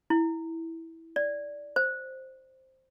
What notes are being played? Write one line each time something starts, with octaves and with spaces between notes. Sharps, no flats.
E4
D5
C5